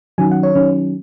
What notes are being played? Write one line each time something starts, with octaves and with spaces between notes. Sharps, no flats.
D#3 F#3 C#4 G#5
F#5
C#5
D#3 F#3 C#4